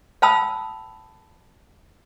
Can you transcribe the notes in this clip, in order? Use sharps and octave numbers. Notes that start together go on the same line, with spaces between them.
F5 G5 A5 B5 D#6 E6